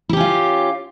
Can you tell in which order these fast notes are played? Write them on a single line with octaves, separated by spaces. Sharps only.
E4 G4 C#4 F4